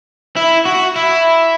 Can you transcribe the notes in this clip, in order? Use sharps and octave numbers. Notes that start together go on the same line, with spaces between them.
E4
F#4
E4